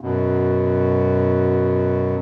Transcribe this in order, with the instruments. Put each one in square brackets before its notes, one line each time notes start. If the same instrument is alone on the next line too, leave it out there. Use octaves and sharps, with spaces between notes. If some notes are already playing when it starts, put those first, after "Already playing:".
[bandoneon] F#2 B2